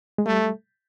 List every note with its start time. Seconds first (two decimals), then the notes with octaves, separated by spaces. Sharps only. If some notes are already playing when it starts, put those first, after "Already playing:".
0.18 G#3
0.26 G3 A3